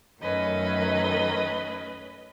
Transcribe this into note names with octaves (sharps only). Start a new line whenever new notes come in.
F#2 D#3 F#3 A3 C#4 B4 D#5